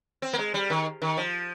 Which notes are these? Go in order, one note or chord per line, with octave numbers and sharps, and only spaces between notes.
C4
A#3
G#3
G3
D#3
D#3
F3